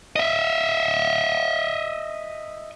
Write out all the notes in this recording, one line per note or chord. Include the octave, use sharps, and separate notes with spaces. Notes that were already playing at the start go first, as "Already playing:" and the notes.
D#5 E5